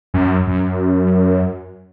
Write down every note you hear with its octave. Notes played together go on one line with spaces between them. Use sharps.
F#2
F#2